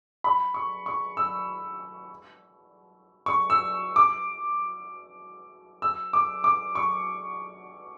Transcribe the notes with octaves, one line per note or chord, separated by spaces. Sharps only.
B5
C#6
C#6
E6
C#6
E6
D6
E6
D6
D6
C#6